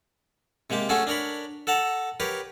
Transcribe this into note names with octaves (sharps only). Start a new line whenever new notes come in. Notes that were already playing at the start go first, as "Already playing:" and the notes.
C3 G#3 A#3 G4
A3 C#4 F#4 G#4 A4
D4 A#4 C#5 B5
A4 F#5 A5 A#5
G4 A#4 B4 C#5